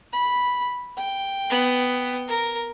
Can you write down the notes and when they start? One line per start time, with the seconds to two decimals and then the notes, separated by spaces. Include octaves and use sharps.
0.13 B5
0.97 G5
1.50 B3
2.28 A#4